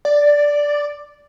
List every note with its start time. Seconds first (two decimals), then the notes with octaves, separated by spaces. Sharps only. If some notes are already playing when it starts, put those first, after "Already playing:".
0.05 D5